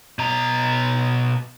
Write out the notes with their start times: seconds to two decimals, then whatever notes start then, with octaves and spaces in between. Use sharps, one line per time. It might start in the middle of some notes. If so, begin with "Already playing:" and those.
0.19 B2 A#5